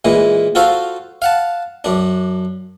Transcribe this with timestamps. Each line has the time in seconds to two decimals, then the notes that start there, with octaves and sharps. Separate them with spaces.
0.05 A#2 E3 G#3
0.55 F4 F#4 A4 C5 F5
1.22 F5 F#5 A5
1.84 F#2 D4